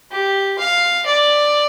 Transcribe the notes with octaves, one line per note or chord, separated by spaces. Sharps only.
G4
F5
D5